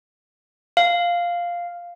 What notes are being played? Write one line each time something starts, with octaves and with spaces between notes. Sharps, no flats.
F5